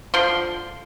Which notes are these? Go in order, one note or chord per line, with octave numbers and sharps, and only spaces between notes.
D3 F3 C6